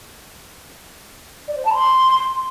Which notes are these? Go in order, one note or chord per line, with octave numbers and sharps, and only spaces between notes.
D5
C5
A5
C6